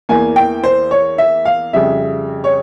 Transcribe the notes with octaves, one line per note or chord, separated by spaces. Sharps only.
E2 E3 A#3 G#5
G5
C5
C#5
E5
F5
F2 C#3 G3 E5
C#5